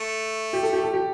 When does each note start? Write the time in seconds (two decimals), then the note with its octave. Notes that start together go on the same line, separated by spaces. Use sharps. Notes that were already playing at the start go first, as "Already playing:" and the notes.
Already playing: A3
0.53 G4
0.63 A4
0.73 G4
0.83 A4
0.93 G4